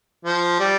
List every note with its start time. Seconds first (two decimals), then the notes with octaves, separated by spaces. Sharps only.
0.25 F3
0.60 G3